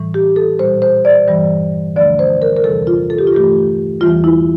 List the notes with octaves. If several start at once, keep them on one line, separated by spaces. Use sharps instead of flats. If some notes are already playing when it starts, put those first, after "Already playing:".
Already playing: A2 E3 G3
G4
A4
A#2 G3 C5
C5
D5
G2 E3 G3
D2 D3 F3 A3 D5
C5
A#4
A#4
E2 C3 E3 G3 A4
F4
A4
G4
F4
G2 E3 A3 G4
E2 E3 G3 F4
E4